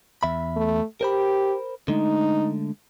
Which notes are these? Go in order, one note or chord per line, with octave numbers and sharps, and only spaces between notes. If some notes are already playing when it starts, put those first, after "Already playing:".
E2 E5 B5
A3
G4 A#4 C5 B5
D3 G#3 A3 D#4